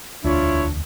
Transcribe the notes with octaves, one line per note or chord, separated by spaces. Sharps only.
E1 D2 D4 E4 F4 C#5